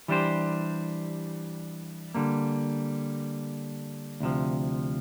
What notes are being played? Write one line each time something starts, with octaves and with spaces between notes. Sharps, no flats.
E3 G3 D4 G4 C5
D3 G3 A#3
D2 C3 F3